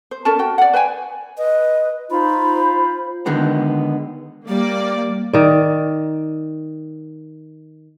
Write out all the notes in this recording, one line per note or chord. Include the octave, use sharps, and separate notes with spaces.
C5
C#4 A4 A#4 A5
F#4 G5
D5 F#5
B4 C5 G5 G#5
B4 D#5
D#4 F4 C5 B5
D3 D#3 G#3 B3
G3 A#3 D5
D#3 D5